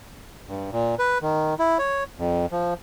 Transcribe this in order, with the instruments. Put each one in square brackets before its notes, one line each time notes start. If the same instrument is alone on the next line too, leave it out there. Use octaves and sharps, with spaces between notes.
[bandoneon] G2
A#2
B4
D#3
E4
C#5
F2
F3